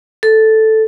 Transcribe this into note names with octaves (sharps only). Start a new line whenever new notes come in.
A4